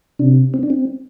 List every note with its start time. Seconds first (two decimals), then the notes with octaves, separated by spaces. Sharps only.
0.19 C3 D4
0.54 C4
0.63 D4
0.70 C4